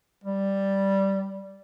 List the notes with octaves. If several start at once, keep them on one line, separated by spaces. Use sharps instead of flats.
G3